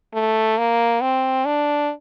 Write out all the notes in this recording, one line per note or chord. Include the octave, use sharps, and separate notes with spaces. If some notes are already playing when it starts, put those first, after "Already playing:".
A3
A#3
C4
D4